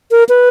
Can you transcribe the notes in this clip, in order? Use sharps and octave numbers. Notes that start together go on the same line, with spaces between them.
A#4
B4